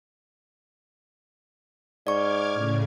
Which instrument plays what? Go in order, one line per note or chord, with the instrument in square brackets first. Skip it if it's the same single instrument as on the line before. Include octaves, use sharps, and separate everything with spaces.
[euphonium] G#2 [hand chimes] D5 C#6 [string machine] D6 F6 G#6
[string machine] A2 C#3